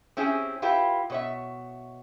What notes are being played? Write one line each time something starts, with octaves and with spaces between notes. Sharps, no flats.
C4 C#4 E4 G4 G#4
E4 F4 G4 B4
B2 C#5 E5